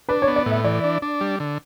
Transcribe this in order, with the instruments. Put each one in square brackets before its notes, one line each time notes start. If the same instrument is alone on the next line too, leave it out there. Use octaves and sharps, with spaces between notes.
[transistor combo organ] D4 [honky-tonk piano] B4
[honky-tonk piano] C#5
[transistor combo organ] B3
[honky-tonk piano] D5
[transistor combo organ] A2
[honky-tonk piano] E5
[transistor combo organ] E3 [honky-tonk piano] D5
[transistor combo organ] D4
D4
G3
D3